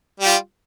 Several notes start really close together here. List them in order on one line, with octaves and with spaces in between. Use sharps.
G3 G4 F4